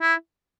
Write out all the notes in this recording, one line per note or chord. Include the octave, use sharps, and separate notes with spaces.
E4